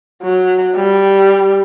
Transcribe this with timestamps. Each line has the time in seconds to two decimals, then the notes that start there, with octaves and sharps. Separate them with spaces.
0.23 F#3
0.75 G3